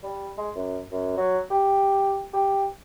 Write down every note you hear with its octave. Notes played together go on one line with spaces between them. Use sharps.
G3
G#3
F#2
F#2
F#3
G4
G4